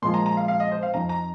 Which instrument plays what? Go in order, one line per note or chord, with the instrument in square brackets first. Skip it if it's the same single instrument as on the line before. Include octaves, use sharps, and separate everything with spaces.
[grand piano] A#2 F3 G#3 F4 [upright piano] C6
[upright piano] A#5
A#5
F5
F5
D#5
C5
F5
[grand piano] F2 F3 C4 D#4 [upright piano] A#5
[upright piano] A#5